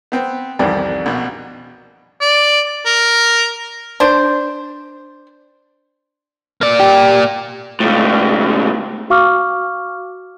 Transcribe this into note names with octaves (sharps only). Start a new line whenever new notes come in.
B3 C4
C2 F2 D#3 E3 G3
A#1 B2
D5
A#4
D4 C5
A#3 D5
G4
C#2 A2
F#4 F5 C#6 D6 F6